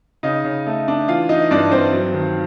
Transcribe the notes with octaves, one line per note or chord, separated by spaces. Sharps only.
C#3 D#4 D#5
C#3
A3
D4
E3 F4 F5
E3 D#4 D#5
G2 D4 D5
G2 C4 C5
F#3
D#3